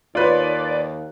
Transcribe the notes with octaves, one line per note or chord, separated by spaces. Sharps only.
D#2 F4 B4 C#5 D5